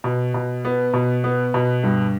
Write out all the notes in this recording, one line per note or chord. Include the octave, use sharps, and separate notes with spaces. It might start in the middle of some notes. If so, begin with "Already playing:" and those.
B2
B2
B3
B2
B3
B2
G2